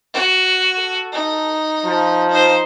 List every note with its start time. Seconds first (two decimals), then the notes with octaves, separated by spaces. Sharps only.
0.14 F#4
0.78 A4
1.12 D#4
1.85 F3
2.30 D#4 C5